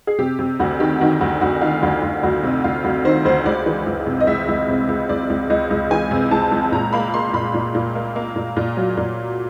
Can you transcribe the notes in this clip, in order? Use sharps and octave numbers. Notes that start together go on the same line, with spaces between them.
G#4
C3 G4
C3 G4
D2 F#4
D#3 G4
D#3 F#4
D2 F#4
D2 F#4
D#3 F4
D2 F4
D2
D2 F#4
C3
D2 F4
D2 F#4
D#3 C5
D2 C5
C#2 D5
E3
C#2
C3
D#5
C#2 E5
C#2
C3
C#2
C#2 D5
C#2
C#2 D#5
C#2
E3 G#5
C3
C#2 A5
C#2
A#2 A#5
A#3 B5
A#3 C6
A#2 B5
A#2
A#2
A#3
A#3
A#2
A#2
F#3
A#2